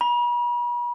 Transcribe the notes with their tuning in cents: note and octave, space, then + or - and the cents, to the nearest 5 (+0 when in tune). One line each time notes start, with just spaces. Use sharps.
B5 -40